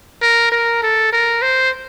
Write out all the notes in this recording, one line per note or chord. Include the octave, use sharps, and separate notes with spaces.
A#4
A#4
A4
A#4
C5